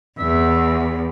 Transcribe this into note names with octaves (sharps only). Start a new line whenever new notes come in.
E2 E5